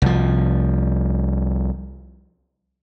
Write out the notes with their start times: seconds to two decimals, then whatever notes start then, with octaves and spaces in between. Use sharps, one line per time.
0.02 C2 F3